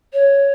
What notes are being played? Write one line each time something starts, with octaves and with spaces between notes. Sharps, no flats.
C#5